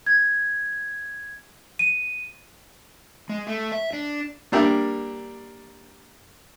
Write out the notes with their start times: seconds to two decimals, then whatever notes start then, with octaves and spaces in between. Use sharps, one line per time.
0.06 G#6
1.79 D#7
3.29 G#3
3.47 A3
3.72 E5
3.93 D4
4.52 G3 A#3 D4 A#4 E5 G5